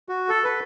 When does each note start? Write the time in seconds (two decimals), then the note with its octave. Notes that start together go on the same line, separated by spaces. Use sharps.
0.09 F#4
0.29 A4
0.44 B4